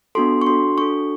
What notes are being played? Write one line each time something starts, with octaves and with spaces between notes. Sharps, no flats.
B3 D4 F#4 A4 C6
C#6
D4 F#4 A4 C6
D4 F#4 A4 C#6